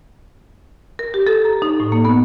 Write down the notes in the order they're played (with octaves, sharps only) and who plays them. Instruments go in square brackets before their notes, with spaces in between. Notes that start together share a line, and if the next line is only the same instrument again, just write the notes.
[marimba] A#4
G4
A4
A#5
D#4
A2
A#3
B3